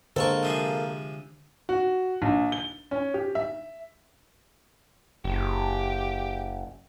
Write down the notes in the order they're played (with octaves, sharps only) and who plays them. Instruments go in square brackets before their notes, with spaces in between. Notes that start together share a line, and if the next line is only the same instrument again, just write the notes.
[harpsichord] C#2 C#6 [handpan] D3 G#4 [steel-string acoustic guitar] A#3 A4 [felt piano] C5
[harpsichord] C3 F3 G#3
[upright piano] F#4
A#1
G7
C#4
G4
E5
[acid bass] F#1 [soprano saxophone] G4